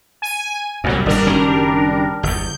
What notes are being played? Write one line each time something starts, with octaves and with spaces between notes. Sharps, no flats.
G#5 D#7
C2 F#2 A#2 F#3 G3
G1 G#2 G3 D4 A#4
F#1 D#3 C#4
G1 E2 G6